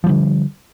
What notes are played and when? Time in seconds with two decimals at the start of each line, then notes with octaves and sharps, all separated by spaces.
0.04 F3
0.06 G3
0.09 D3